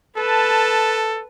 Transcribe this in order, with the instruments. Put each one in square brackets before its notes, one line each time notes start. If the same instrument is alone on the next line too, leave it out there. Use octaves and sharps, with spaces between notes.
[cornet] A4 [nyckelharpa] B4 A5